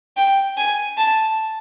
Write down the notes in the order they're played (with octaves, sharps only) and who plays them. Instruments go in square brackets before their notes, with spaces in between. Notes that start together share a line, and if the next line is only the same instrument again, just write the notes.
[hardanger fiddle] G5
G#5
A5